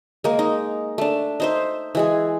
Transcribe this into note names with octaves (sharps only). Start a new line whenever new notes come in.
G#3 A#3
D#4
A3 D4
D#4 C5 E5
E3 G#3 G#4